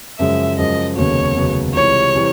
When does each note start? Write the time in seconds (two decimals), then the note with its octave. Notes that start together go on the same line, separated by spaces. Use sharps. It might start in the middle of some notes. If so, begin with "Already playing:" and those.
0.19 F#2 C#3 F3 G#3 E5
0.58 F#2 C#3 F3 G#3 D#5
0.97 F1 D#2 C#3 F#3 B3 C#5
1.36 F1 D#2 C#3 F#3 B3
1.74 C#2 C3 E3 G3 C#5
2.15 C3 E3 G3